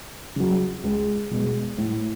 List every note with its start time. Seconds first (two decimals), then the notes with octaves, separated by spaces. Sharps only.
0.36 C#3 F#3
0.84 C#2
1.31 B2 G#3
1.78 A2